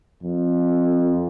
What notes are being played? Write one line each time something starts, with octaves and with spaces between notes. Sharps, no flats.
F2